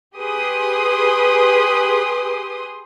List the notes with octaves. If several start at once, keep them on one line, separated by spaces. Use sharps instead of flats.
G4 G#4 B4 C6 D#6